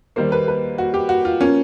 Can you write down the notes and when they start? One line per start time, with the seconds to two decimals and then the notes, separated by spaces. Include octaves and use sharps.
0.16 D#2 D#3 G3 A#3 C5
0.32 B4
0.48 B4
0.78 F#4
0.94 G4
1.09 F#4
1.25 F4
1.40 F3 A#3 C#4